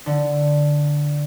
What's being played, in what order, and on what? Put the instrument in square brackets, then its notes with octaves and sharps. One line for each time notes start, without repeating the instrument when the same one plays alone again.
[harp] D3